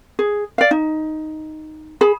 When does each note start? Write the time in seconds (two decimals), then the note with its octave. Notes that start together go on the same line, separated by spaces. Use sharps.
0.19 G#4
0.58 D5 F5
0.71 D#4
2.01 G#4 B5